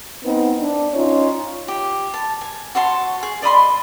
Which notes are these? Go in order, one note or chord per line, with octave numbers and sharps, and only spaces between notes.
B3 C4 D#4 B4
D4
C#4 D#4 F4 C#5
G4
A5
G#5
F#4 C#5 A5 C6
G#4
D5 D#5 B5 C6